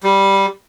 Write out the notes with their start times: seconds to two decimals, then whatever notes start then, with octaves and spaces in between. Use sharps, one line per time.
0.03 G3